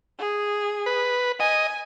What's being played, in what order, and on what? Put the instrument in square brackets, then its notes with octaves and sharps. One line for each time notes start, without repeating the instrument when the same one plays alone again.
[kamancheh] G#4
[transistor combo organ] B4
[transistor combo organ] D#5 [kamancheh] G#5